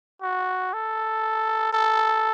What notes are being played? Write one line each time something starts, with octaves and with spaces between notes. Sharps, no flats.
F#4
A4
A4